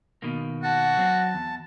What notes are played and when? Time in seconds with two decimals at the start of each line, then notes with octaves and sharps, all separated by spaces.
0.22 B2 D#3 A#3
0.63 F#4 F#5 A5
0.97 F#3 C4
1.35 E2